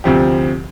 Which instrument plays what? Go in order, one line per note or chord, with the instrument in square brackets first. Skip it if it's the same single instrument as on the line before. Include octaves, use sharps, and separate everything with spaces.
[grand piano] D2 C3 F3 C4 G4